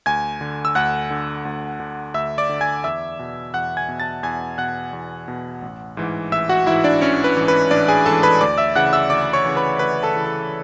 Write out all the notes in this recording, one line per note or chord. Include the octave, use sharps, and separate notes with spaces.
D2 G#5 G#6
D3
E6
D2 F#5 F#6
D3
D2
D3
D2 E5 E6
D5 D6
D3
G#5 G#6
E2 E5 E6
B2
E2 F#5 F#6
G#5 G#6
B2
A5 A6
E2 G#5 G#6
B2 F#5 F#6
E2
B2
A1
G#2 E3
A1 E5 E6
F#4 F#5
G#2 E3 E4 E5
D4 D5
A1 C#4 C#5
B4
G#2 E3
B4
A1 D4 D5
G#4 G#5
G#2 E3 A4 A5
B4 B5
D2 D5 D6
E5 E6
C#3 E3 F#5 F#6
E5 E6
D2 D5 D6
C#5 C#6
C#3 E3
B4 B5
D2 B4 B5
A4 A5
C#3 E3
A4 A5